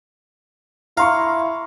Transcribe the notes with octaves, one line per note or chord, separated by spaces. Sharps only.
E4 F5 A#5 C6 C#6